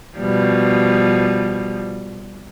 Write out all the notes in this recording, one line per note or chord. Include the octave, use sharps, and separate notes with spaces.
B2 F3 G3